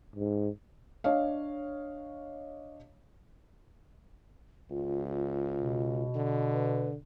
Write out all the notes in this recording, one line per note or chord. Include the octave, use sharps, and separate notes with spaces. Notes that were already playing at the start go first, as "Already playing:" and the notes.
G#2
D4 C#5 D#5 F5
C#2 F4
F4
B2
D3
B4